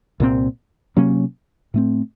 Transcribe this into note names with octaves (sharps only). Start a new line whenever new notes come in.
C2 A#2 F3 C4
C3 F#3 A#3 C#4
A2 A3 C4